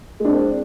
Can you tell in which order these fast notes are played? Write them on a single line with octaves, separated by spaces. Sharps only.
G#3 D4 C4